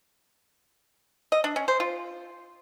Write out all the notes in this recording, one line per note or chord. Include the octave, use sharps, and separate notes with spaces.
D#5
D4
C#4
C5
F4